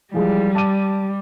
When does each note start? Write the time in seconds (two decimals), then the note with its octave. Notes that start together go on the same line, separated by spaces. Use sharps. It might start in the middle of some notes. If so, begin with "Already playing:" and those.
0.14 E3 F3 G3 G#3
0.55 A5 D6 D#7